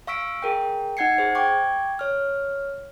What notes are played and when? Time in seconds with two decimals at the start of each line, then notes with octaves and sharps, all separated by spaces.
0.07 F5 C#6 E6 B6 D7
0.42 G#4 A#4 G5
0.97 D#4 F#5 G#6 C7 C#7
1.18 G#4 C5
1.35 G5 C#6 D6 G#6
1.99 C#5 F6